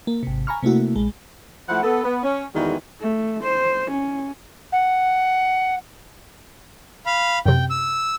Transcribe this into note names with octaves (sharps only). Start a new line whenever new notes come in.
A#3
G#1 C3
G#5 A#5 B5 C#6 F6
C3 A3 A#3 E4 F#4
A#1 G#3
F3 A3 E4 F#5
B3 A4
B3
C#4
E2 D#3 E3 G3 G#3 F#4
A3
C5
C#4
F#5
F5 B5
F#2 C3 G5
E6